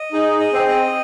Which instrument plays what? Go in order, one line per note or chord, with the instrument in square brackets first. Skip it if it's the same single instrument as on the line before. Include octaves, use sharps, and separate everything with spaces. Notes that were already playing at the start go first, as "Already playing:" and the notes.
Already playing: [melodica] D#5
[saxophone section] D#4 [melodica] G#4
[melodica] D#5
[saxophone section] C4
[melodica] D#5